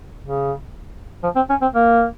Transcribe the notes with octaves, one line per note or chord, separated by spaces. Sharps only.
C#3
F3
C4
C#4
C4
A#3